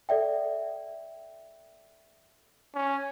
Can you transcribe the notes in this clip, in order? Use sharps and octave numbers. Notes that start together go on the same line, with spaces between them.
A4 D5 E5 G5
C#4